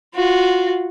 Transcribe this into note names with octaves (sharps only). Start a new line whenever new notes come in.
F4 F#4